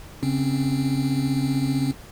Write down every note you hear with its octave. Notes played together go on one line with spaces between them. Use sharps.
C#3 C4 C#4